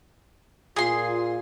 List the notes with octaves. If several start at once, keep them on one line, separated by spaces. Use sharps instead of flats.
A#2 F4 G#4 C6